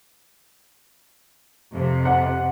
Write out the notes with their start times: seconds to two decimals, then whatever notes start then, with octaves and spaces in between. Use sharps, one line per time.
1.74 F2 C3
2.05 F#5